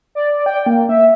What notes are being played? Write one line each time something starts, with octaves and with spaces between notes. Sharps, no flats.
D5
G5
A#3
E5